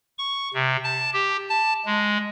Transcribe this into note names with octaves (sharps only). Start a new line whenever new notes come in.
C#6
C3
A5
G4
A5
G#3